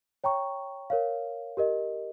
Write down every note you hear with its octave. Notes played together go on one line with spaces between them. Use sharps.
C#5 G5 A#5 C#6
A#4 C#5 F5
G4 A#4 D#5